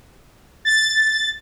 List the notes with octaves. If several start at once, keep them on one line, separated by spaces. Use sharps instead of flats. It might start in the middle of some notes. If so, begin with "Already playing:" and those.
A6